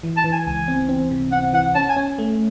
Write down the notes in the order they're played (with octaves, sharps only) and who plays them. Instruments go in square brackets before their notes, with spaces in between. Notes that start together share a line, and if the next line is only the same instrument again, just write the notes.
[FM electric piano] E3
[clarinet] A5
[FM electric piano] E3
[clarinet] G#5
[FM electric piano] C#2 [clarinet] G#5
[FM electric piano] C4
C4
C3
[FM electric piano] C4 [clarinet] F#5
[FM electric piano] E3 [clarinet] F#5
[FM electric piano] C#4 [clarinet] A5
[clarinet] G#5
[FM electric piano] C#4
A3